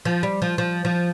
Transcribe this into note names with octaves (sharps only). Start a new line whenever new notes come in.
F3
G3
F3
F3
F3